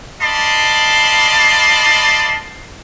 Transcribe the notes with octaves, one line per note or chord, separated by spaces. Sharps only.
D5 D#5 F5 A5 B5 C6